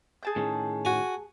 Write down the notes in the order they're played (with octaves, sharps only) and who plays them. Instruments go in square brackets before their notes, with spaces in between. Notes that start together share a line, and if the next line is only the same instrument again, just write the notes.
[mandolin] G#4 A5 G6
[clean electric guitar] A2 D#3 C#4
[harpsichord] F#4 G#5